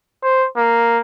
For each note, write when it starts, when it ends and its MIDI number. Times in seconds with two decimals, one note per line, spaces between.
0.23 0.47 72
0.57 1.00 58